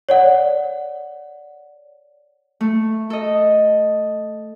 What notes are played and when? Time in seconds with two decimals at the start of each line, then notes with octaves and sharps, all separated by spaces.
0.09 C#5 D5 F#5
2.61 A3
3.10 A4 D#5